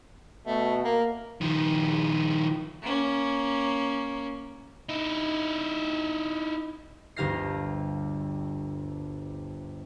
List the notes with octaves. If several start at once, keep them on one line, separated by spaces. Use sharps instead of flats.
B2 A3
A#3 A#4
D#3 F3
A#3 C#4
D#4 E4
G1 D2 G4 F5 A#6 C7